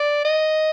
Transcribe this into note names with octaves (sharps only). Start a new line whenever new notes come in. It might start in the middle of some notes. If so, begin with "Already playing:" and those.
Already playing: D5
D#5